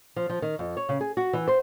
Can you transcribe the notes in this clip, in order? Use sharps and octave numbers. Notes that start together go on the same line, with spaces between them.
F3
F3
D#3
F2
C#5
C#3
G#4
F#4
E3
C5